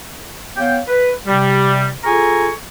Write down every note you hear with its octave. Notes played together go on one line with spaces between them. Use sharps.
B3 C#5 F5 G5
B4
C3 G3
F4 G#4 A4 G#5 A#5 C#6